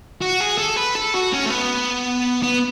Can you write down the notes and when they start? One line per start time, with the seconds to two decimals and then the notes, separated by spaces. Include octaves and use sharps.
0.21 F#4
0.40 G#4
0.58 A4
0.76 B4
0.95 A4
1.14 F#4
1.32 C#4
1.46 A3
1.50 B3
2.43 B3